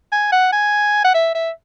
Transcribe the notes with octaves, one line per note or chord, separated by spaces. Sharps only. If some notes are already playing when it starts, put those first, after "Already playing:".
G#5
F#5
G#5
F#5
E5
E5